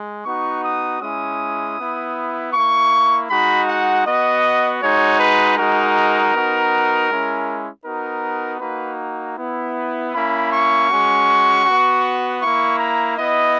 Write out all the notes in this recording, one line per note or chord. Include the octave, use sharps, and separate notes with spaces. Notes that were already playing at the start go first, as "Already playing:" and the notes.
Already playing: G#3
B3 D#4 F#4 C#6
D#6
G#3 C#4 E4 D#6
B3 E4
A#3 E4 C#6
G#3 D#4 F#4 B5
F#5
B3 F#4 D#5
G#3 D#4 F#4 C#5
B4
G#3 D#4 F#4 A#4
B3 D#4 F#4
G#3 C#4 E4
B3 D#4 F#4 A#4
A#3 D#4 F#4 B4
B3 E4
A#3 C#4 E4 B5
C#6
G#3 C#4 F#4
B3 F#4
A#3 E4 C#6
A#5
B3 E4 D#5